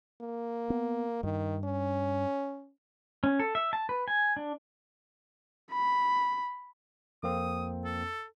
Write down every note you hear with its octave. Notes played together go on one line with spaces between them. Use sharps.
A#3
B3
G2 D#3
C#4
C#4
A4
E5
A5
B4
G#5
D4
B5
F2 A#3 C4 D#6
A4